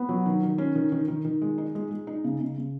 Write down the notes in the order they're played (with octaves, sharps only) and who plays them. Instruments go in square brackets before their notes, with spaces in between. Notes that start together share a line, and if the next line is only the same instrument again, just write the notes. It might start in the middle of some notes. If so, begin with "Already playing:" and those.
Already playing: [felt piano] B3
F#3
D#3
D#3
C#4
D#3
D#3
D#3
D#3
G#3
D#4
G#3
G#3
D#4
C#3
C#3
C#3